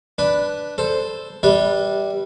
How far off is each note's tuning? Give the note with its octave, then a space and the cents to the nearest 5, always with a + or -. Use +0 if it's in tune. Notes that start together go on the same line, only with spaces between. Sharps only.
D4 +0 B4 +0
A4 +0 C5 +0
G3 +0 B4 -20 E5 -35